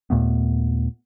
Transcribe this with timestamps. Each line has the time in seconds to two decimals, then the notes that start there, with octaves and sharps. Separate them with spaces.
0.10 D#2 A#2 A3 B3